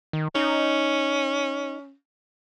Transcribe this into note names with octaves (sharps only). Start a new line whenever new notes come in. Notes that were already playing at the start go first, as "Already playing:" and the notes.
D#3
C#4 D#4